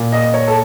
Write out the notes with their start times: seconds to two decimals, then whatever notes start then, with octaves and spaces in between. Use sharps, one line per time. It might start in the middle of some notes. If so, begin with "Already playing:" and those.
Already playing: A#2
0.12 D#5
0.34 C#5
0.47 A4